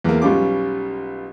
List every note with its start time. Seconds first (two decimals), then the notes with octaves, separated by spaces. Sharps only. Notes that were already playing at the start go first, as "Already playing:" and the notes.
0.04 E2 A#3
0.22 B1 G3 C#4 F4 D6